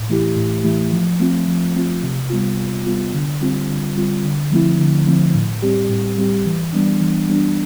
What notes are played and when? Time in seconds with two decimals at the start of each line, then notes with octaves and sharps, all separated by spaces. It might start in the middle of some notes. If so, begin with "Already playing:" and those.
Already playing: A2
0.09 E3 A3 E4 G4
0.37 A2
0.64 E3 A3 E4 G4
0.92 F3
1.20 A3 C4 F4
1.47 F3
1.75 A3 C4 F4
2.03 C3
2.30 G3 B3 F4
2.58 C3
2.86 G3 B3 F4
3.13 D3
3.41 G3 C4 F4
3.69 D3
3.96 G3 C4 F4
4.24 D3
4.51 F3 A3 C4 E4
4.79 D3
5.07 F3 A3 C4 E4
5.34 A2
5.62 G3 C4 G4
5.89 A2
6.18 G3 C4 G4
6.46 E3
6.73 G3 B3 D4
7.00 E3
7.29 G3 B3 D4